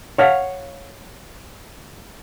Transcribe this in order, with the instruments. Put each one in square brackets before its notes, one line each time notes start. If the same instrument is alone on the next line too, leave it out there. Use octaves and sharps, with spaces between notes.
[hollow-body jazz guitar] C#5 F5 F#5